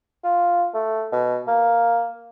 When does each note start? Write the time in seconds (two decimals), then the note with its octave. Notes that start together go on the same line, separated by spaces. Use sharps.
0.24 F4
0.74 A3
1.12 B2
1.47 A#3